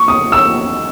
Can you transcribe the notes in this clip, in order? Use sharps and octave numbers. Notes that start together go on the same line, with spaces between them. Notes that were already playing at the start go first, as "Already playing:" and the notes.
Already playing: C#6
D#6
E6